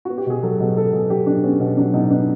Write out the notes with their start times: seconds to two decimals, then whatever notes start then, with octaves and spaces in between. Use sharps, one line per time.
0.05 B3 F#4
0.18 G4
0.27 B2 G#4
0.43 F#3 A4
0.60 B2
0.76 B3 A4
0.93 B2 G#4
1.10 F#3 G4
1.26 B2 D4
1.43 B3 C#4
1.60 B2 C#4
1.77 F#3 D4
1.94 B2 D#4
2.10 B3 D4